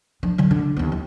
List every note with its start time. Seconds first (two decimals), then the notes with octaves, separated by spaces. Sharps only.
0.23 F3 D4
0.38 D3 F#3
0.51 D3 G#3
0.77 D#2 B3
0.92 E3